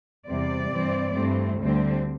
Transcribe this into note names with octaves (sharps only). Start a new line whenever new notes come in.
E2 C3 G3 C4 D5
G2 E3 C4
G2 E3 A3 C4
D2 D3 G3 C4